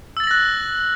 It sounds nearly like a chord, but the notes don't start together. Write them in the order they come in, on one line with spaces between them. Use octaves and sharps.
E6 A6 F#7 A#6 F#6